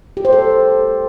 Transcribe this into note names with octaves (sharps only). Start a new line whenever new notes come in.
G4
C5
A4